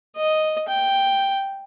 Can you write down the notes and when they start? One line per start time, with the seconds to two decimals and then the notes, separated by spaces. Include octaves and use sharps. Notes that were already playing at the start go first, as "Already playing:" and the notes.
0.17 D#5
0.68 G5